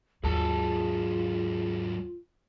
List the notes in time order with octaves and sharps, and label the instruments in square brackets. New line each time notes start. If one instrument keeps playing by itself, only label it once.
[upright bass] D#2 [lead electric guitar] G#2 F#3 [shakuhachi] F4 [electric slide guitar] G#4 A5